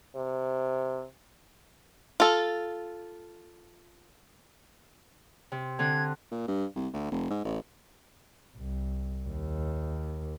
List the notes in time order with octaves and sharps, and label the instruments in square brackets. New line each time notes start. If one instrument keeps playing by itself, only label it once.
[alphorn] C3
[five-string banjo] F4 A4
[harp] C3
[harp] D3 C4 F#6 [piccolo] G#6
[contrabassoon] A#2
G2
C2
D2
F1
G#2
A1
[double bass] C2
D#2